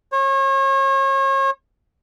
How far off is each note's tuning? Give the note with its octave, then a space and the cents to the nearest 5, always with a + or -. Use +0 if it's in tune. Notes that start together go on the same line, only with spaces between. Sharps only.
C#5 -35